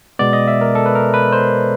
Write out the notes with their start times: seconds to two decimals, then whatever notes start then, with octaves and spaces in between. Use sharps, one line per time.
0.19 B2 G#3 B3 D5
0.33 D#5
0.48 E5
0.61 A#4
0.75 A4
0.86 B4
0.95 A#4
1.14 B4
1.32 C5